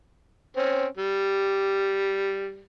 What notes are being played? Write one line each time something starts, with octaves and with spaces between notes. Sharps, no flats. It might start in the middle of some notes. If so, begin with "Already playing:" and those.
C4 C#4
G3